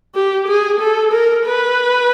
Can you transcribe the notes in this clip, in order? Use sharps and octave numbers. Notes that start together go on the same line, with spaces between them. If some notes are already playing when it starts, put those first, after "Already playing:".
G4
G#4
A4
A#4
B4